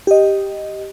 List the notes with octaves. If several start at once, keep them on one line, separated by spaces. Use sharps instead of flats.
G4 D#5